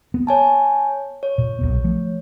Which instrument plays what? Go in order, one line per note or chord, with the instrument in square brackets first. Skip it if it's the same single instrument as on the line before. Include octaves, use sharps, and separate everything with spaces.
[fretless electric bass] B3
[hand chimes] C#5 G#5 A5
C#5
[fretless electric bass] A#2
B1 E2 B3
F3 A3